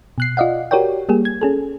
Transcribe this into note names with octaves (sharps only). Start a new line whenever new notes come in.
B2 F#6 C7
F4 D5 D#5 F5 F#5
F#4 G4 A#4 C#5 D5 G5
G3 A#3 G4 G#4
G#6
C#4 G#4 A4